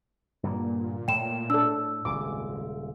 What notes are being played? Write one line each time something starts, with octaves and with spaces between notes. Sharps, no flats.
G2 A#2 D3 A#3
A2 G5 E7
D4 A4 E6
D#1 G#1 C#3 G#3 D6